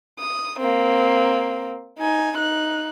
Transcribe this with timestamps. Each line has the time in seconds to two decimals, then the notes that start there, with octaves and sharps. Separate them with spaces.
0.19 D#6
0.59 A#3 C4
1.99 D#4 G#5
2.37 D#4 F#6